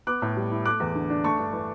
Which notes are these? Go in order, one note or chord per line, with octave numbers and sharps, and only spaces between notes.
B3 D6 F#6
A2
G3
E4
A3 D6 F#6
E2
D3
D4
A3 A5 C#6
G2
E3